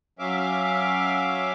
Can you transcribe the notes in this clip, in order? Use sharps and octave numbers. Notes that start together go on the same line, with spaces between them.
F#3 C#4 E5 F5 D6